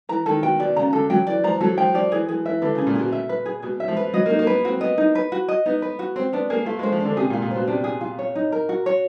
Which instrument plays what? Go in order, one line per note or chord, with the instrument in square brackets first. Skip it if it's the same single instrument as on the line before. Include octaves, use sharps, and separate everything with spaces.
[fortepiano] E3 [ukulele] A#5
[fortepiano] D#3 [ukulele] A4
[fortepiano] B2 [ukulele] G5
[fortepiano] B2 [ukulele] D5
[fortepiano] C#3 [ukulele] A#5
[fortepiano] D3 [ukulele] A4
[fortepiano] F#3 [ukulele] G5
[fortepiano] E3 [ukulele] D5
[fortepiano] F3 [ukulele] A#5
[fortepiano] F#3 [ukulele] A4
[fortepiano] F3 [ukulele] G5
[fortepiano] F3 [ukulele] D5
[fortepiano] E3 [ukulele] G#4
[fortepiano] E3 [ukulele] G#4
[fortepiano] E3 [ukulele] E5
[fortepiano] D3 [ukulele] B4
[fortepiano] C#3
[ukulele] G#4
[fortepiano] A#2
[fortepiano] B2 [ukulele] G#4
[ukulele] E5
B4
G#4
[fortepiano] B2 [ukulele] G#4
[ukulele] E5
[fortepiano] F3
[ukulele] B4
[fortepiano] F#3 [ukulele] D#5
[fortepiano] A#3
[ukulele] D#4
[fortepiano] A#3
[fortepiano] B3 [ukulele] B4
[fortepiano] C4 [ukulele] F#4
[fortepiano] B3 [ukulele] D#5
[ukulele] D#4
B4
F#4
D#5
[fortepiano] B3 [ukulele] D#4
[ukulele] B4
F#4
[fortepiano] C4 [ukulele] C5
[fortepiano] B3 [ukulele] D4
[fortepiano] A#3 [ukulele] G#4
[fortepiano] A3 [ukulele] F4
[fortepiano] G#3
[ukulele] C5
[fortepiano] F3
[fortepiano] D3 [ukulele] D4
[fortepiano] C3 [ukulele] G#4
[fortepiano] A#2
[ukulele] F4
[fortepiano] A#2
[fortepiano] B2 [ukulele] C5
[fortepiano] C3 [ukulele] D4
[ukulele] G#4
F4
C#5
D#4
A#4
F#4
C#5